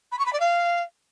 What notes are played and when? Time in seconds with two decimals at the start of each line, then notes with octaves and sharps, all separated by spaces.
0.11 B5
0.19 C#6
0.26 B5
0.33 D5
0.40 F5